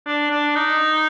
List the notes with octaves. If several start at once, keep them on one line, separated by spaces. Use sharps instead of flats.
D4
D4
D#4